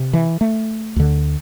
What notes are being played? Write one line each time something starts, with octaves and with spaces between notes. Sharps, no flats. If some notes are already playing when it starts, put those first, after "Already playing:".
Already playing: C3
E3
A3
D2 D3